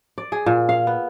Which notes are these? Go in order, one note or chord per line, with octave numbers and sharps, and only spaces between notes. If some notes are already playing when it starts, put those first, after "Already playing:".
D5
G#4
A#2
F5
B3